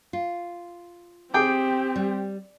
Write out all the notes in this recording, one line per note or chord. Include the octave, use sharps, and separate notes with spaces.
F4
C4 G4 G#4 G5 D6
G3